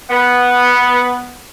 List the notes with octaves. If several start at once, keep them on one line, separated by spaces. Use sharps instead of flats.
B3